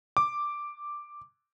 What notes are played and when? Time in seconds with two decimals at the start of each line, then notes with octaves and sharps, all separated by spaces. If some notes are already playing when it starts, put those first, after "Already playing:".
0.17 D6